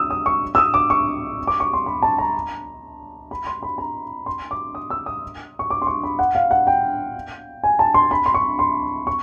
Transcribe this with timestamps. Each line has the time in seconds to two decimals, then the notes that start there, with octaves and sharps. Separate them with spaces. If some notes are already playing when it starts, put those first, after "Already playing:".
Already playing: D#6 E6
0.10 D#6
0.26 C#6
0.55 E6
0.58 D#6
0.74 D6
0.90 C#6
1.47 D6
1.60 C#6
1.73 C6
1.86 B5
2.02 A5
2.18 A#5
3.31 B5
3.47 C6
3.63 B5
3.78 A#5
4.26 C6
4.51 D6
4.75 D#6
4.90 E6
5.06 D#6
5.59 C#6
5.70 D6
5.82 C6
5.87 C#6
6.03 B5
6.19 F#5
6.35 F5
6.51 F#5
6.67 G5
7.63 G#5
7.79 A5
7.94 C6
8.11 B5
8.26 C6
8.34 C#6
8.59 C6
9.07 C#6